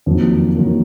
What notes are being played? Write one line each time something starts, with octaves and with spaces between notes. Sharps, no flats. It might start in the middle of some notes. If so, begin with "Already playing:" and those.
F2 D#3 F#3 A#3
D#3 F#3 A#3